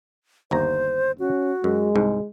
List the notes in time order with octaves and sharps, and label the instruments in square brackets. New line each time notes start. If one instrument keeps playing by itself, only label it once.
[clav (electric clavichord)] G1 D#2 A#5 [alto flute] C5
[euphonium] C#4 [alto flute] F#4
[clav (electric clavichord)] F#2 [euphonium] G#3
[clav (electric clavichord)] C2 G#2